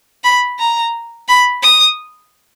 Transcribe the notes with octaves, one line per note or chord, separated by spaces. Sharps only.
B5
A#5
B5
D#6